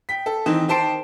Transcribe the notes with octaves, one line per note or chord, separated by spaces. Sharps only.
G5 B6
A4
D#3 E3 C4 D#4
D#3 G4 C5 A5 C7 D7